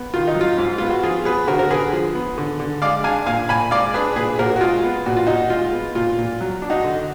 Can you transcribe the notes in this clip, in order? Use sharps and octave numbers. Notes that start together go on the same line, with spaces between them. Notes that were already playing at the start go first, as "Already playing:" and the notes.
Already playing: B3
D#3 F4
D#4
F#3
F4
G#2
B3 F4
F#4
F3 F4 G#4
B3 G#4 B4
D3 F#4 A#4
A#4
D3 G#4 B4
F3
B3
D3
D3
G#3 D5 F5
D4 F5 G#5
A#2 F5 G#5
A#2 G#5 B5
G#3 D5 F5
D4 G#4 B4
A#2 G#4 B4
A#2 F#4 A#4
F#4
G#3 F4 G#4
B3
A#2 F#4
F4
A#2 D#4 F#4
G#3 F4
B3
A#2 F4
A#2
F#3
D4
D#4 F#4
D3